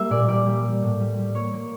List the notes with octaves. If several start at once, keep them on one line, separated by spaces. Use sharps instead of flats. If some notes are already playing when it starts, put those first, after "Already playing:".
Already playing: G3 A#3 E5 A#5
A#2 D5
G3 D5
G3
G3
A2
G3
G3
A#3 C#5
A#3